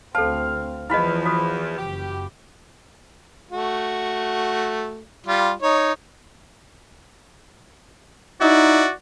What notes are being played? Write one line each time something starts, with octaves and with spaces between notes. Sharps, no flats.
D2 C4 A4 F5 A5
E2 E3 F3 E4 D#5 F5 B5
F#4 C5 D#6
F#1 F#2 G4
A3 F#4
G3 F4
D#4 C#5
D#4 E4 F#4 D5